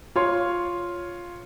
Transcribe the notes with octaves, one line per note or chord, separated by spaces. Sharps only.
F4 C#5 C6